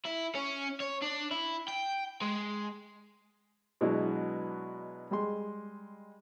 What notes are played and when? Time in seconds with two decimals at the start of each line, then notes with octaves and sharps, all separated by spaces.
0.05 E4
0.35 C#4
0.80 C#5
1.02 D4
1.31 E4
1.68 G5
2.22 G#3
3.81 B2 F#3 G#3 D4 E4
5.11 G3 G#3 C6